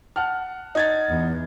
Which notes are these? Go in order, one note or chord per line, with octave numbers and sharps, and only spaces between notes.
F#5 A5 F6
D#4 G#6 A6
E2